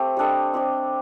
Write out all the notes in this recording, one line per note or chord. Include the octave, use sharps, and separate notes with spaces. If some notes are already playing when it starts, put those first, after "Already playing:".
Already playing: A3 C4 G4
G3 D4 A4 D#5
C4 G4 D5